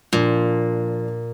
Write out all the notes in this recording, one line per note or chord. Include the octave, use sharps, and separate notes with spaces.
A#2 F3 D4